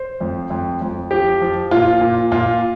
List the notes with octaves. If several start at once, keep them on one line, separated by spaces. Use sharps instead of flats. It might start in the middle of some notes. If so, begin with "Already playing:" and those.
Already playing: C5
F2
F2
F2
F3 G4
F3
A#2 F4
A#2
A#2 F4